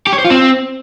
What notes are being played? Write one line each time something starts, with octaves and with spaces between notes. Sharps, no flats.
G4
C#5
C5
F4
C4